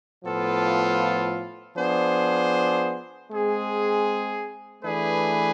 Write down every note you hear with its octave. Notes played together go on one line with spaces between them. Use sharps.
A2 F3 B3 F4 A4
F3 B3 D4 G#4 C5
G#3 C4 G#4
E3 A3 D4 G#4 B4